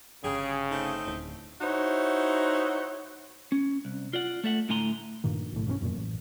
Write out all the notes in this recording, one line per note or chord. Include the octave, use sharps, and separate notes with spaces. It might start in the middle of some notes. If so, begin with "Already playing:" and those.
G1 C#3 G4 G#4
A3 C4 D#4
D1
D#4 E4 F#4 C5 C#5
C#4
C2
F4 D5 F#5
A3 A4 E5 F#5
A2 D3 A3 G#5 A#5 C6
G2 A#2 D#3
B1 A2
B1 G2 F#3 C#4
F1 F#2 A#2
A1